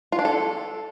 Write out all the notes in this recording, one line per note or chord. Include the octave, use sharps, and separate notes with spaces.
F4
D4
A4